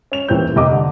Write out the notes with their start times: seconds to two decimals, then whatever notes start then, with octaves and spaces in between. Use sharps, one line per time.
0.12 C#4 F7
0.29 D#1 D#2 E3 C4 C#5 G6
0.56 F1 G4 D#5 D6
0.72 D3